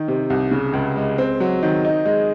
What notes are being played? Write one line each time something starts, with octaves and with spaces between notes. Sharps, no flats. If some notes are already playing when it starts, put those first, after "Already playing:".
Already playing: D#3
C3
C2
C#3
C#2
G#3
C4
F#3
D#3
D#4
G#3